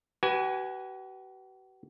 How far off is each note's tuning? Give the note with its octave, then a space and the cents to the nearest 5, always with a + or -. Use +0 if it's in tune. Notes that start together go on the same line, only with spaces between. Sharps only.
F#4 +45 B4 +0 G#5 +0